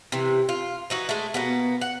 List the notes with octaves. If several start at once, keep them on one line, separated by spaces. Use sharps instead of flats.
C3 E3
F4
E3 D#4 F#4
G#3 A3
B2 A#3 B3
F#5